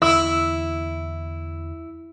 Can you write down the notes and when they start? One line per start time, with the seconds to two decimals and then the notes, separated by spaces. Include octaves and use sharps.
0.02 E2 D3 E4 E6